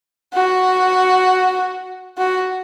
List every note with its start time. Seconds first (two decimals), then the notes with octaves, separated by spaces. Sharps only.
0.34 F#4
2.18 F#4